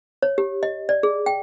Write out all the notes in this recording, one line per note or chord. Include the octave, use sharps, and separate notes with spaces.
C#5
G4
D#5
D5
G#4
G5